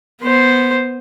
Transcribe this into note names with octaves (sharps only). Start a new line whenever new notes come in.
B3 C5